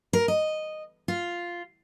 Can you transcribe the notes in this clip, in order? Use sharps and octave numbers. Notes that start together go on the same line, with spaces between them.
A#4
D#5
F4